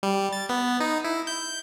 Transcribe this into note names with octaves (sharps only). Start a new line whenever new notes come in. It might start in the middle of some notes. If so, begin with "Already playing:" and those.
G3
A6
B3
D#4
E4
G6